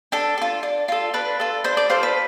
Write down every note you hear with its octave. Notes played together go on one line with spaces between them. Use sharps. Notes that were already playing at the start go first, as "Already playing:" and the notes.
D4 A4
F4 A4
D4
F4 A4
D4 B4
F4 A4
D4 C5
D5
F4 A4 C5
B4